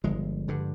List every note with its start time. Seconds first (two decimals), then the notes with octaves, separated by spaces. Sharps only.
0.04 G1 F3 G#3
0.48 G2 D3